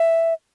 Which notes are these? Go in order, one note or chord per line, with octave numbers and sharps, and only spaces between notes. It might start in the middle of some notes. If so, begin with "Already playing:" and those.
Already playing: E5